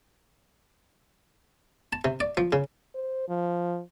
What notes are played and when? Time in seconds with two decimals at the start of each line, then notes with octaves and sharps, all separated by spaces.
1.93 A5
2.05 C3
2.20 D5
2.37 F3
2.52 C#3
2.94 C5
3.28 F3